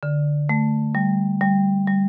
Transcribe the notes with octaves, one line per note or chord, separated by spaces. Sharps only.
D3
A3
G3
G3
G3